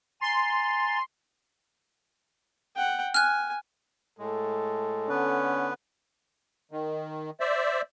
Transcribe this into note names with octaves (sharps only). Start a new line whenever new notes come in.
G#5 A#5 C6 A6
F#5 G5
G#5 F6 F#6
A2 G#3 A4
D3 B3 C#4 B4
D#3
C5 D5 E5